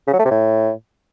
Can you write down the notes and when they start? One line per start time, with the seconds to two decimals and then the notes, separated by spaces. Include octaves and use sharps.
0.07 C#3
0.13 F#3
0.19 A3
0.25 C3
0.31 A2